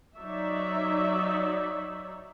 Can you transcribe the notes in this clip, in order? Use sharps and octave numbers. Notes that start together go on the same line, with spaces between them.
F#3 D#4 C#5 D5 E5